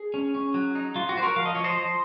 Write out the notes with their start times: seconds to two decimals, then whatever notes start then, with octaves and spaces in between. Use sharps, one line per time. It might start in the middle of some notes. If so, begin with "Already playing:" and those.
Already playing: G#4
0.14 C#4
0.35 C#4
0.54 F#3
0.75 D#4
0.95 F#3 F4
1.09 F#4
1.15 F#3 C5
1.22 F#4 A#4
1.36 F3 F5
1.46 D#5
1.55 F3 C#5
1.64 C5 D#5
1.76 F3